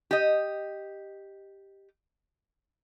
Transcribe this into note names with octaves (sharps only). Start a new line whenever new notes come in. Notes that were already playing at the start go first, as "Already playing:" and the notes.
G4 D#5